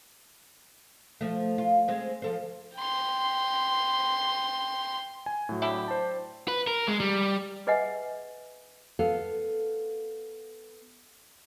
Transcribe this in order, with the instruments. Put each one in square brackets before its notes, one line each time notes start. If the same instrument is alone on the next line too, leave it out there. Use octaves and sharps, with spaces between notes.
[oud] F3 A3
F4
G#3 C4 C#4
F3 A4 C5
[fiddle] G5 C6
[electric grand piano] G#5
A2 F#3
[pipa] D4 E4 G4
[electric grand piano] C5 A5
[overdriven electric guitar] B4
A#4
G#3
G3
[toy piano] G#4 B4 D#5 E5 F#5 G#5
[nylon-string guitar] B3 A4 F5